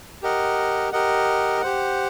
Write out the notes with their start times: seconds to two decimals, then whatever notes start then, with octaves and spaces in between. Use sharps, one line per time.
0.22 G4 A#4 D#5 F#5
0.92 G4 A#4 D#5 F#5
1.61 G4 C5 F#5